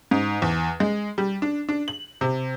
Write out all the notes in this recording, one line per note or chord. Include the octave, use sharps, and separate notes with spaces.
G#2
E2
G#3
G3
D4
D4
F#7
C3